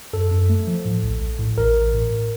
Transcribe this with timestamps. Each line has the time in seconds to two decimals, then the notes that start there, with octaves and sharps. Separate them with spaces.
0.13 F#2 A4
0.31 F#2
0.49 A3
0.67 F3
0.85 A2
1.03 A#1
1.21 A#1
1.39 A2
1.57 A1 A#4
1.75 A1
1.93 A2
2.11 A2